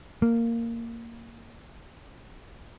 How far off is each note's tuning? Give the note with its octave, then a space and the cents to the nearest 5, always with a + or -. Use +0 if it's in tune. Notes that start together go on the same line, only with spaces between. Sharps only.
A#3 -10